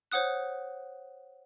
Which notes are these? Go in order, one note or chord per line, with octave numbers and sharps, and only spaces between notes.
C5 C#5 F#5 D#6 F#6